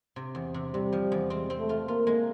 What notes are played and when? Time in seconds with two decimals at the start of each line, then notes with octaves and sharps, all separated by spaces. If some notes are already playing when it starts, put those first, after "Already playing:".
0.16 C3
0.35 E2
0.54 C3
0.74 C3 G3
0.92 F3
1.12 E2
1.30 G#3 C4
1.50 C4
1.59 A3
1.69 F4
1.88 A#3 F4
2.07 G#3